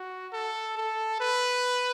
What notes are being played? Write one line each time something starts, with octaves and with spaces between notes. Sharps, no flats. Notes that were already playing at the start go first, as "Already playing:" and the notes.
Already playing: F#4
A4
A4
B4